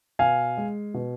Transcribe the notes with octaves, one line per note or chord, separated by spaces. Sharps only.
B2 F5 G#5
G#3
B2